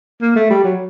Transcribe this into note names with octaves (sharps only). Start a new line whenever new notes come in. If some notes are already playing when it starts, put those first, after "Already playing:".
A#3
A3
G3
F#3